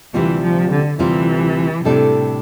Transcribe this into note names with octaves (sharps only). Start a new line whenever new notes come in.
D2 C3 E3 G3 C4 F4
F3
D3
D2 C3 E3 G3 C4 F4
A2 C3 G3 D4 A4 D5